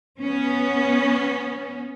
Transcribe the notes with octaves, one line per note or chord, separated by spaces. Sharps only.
B3 C#4